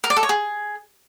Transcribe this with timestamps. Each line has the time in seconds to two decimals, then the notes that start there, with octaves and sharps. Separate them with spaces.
0.04 A#4
0.10 D5
0.16 A4
0.23 C#5
0.29 G#4